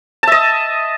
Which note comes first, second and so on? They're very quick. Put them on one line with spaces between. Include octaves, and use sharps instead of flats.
A5 E5 D#5